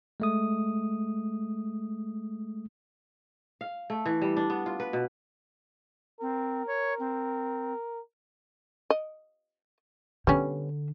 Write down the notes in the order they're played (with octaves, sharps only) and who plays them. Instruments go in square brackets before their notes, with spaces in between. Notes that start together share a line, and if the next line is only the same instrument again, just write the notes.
[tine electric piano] G#3 A3 D#6
[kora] F5
A3
E3
G3
D4
B3
F4
B4
B2
[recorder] C4 [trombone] A#4
[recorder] C#5
C4
[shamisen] D#5
[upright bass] D3 [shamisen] G3 B3 C#4